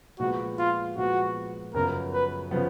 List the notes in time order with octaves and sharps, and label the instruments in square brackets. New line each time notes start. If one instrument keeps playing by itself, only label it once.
[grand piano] A#2 F3 G#3 B3 [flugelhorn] F#4
[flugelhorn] F4
[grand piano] A#2 F3 G#3 B3 [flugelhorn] F#4
[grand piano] F#2 C#3 F3 B3 [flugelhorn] A#4
[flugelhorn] B4
[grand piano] C#3 F3 B3